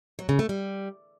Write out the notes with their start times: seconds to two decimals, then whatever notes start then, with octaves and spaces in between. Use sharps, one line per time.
0.19 F#3
0.29 C#3
0.39 A3
0.49 G3